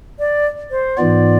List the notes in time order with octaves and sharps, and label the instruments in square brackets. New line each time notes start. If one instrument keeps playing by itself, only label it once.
[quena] D5
C5
[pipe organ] G#2 E3 B3 F4 [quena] D5